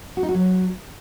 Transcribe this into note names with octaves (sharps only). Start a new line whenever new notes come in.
F#4
D#4
F#4
F#3